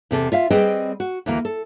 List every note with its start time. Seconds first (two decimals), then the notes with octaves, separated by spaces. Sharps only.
0.11 E2 C3 A4
0.32 F4 E5 F5
0.50 G3 C4 G#4 B4 D#5 G5
1.00 F#4
1.26 D2 E3 A#3
1.45 A4